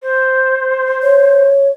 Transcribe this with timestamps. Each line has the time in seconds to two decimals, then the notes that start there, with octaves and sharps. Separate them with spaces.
0.02 C5
1.02 C#5